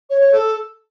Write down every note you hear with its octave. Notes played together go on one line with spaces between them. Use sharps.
C#5
C#5
A4